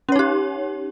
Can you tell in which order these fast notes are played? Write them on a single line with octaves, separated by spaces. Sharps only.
C#4 C#5 D#4 G4